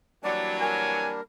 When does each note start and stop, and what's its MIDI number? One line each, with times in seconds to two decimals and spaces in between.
0.23 1.12 52
0.23 1.12 54
0.23 1.21 55
0.23 1.21 58
0.23 1.21 62
0.23 0.50 66
0.23 0.56 74
0.61 1.22 70
0.61 1.08 80